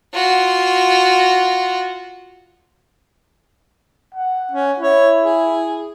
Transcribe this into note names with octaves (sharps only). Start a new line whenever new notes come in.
F4 F#4
F#5
C#4
E4 C#5
G#4